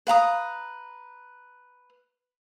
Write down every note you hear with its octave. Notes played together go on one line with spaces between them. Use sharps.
B4 F5 A#5 D#6